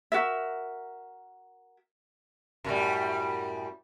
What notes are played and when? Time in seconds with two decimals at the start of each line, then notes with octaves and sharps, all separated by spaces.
0.12 F#4 A#4 E5
2.64 F#2 A2 G3